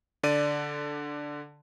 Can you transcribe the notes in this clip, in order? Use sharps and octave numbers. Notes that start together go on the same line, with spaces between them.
D3 D5 D#7